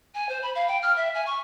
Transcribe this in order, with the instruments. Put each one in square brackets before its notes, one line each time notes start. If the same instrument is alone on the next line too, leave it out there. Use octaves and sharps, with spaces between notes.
[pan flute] G#5
C5
B5
F5
G5
F6
E5
G#5
C#6